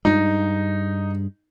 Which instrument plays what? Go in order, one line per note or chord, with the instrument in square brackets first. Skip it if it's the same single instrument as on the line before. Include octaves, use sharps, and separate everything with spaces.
[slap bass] G2 G#3 [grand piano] D#4